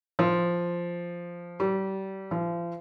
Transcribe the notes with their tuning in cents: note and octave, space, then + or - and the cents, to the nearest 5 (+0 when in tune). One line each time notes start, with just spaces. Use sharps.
F3 -5
G3 -30
F3 -35